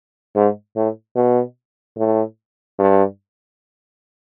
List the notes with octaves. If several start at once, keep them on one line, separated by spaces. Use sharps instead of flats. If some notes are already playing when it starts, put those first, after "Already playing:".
G#2
A2
B2
A2
G2